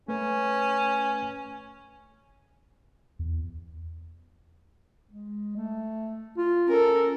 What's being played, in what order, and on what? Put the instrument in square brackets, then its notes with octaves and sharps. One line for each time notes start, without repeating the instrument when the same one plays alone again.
[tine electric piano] A3 B4 [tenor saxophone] C#4
[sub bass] E2
[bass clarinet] G#3
A3
F4
[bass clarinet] C#4 [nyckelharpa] A4 A#4